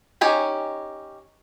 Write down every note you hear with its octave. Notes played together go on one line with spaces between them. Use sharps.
C#4 D#4 G4 G#5